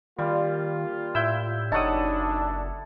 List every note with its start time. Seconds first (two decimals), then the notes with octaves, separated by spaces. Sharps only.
0.19 D#3 G3 A#3 F4
1.15 A2 E4 E6 G6
1.72 F#1 F#2 D4 D#4 A4 C#5 F#5 D#6